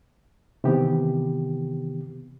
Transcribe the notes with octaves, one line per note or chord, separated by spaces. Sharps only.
C3 D#3 E3 B3 G4